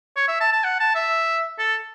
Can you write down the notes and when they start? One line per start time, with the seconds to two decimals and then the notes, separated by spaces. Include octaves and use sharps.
0.16 C#5
0.28 E5
0.41 A5
0.52 A5
0.64 F#5
0.80 A5
0.95 E5
1.58 A4